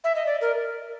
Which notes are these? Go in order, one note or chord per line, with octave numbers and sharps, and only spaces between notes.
E5
D#5
D5
A#4